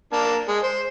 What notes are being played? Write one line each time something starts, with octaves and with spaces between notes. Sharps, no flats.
A#3 D4 A5
G#3
C5